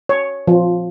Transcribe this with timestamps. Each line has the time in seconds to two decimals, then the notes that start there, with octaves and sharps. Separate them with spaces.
0.09 C#5
0.48 F3